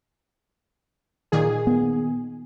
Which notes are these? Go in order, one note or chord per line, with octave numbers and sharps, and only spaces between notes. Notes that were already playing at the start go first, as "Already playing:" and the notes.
A#2 D#3 G#4
B3